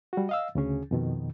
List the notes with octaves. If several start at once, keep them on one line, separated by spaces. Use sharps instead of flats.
G3 F#4
D#5 F5 E6
D2 C#3 C#4 G#4
F2 B2 D#3